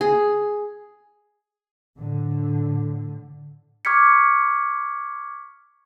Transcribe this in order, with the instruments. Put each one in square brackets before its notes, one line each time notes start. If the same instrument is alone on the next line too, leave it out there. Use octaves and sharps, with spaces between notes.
[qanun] G#4
[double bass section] A2 D3
[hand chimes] C#6 D6 F6 G#6 B6 C#7